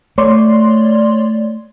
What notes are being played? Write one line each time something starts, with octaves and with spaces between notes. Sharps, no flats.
A3 C#5 D5 C6